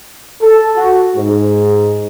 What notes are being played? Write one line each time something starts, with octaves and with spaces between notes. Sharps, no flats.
A4
F#4
G#2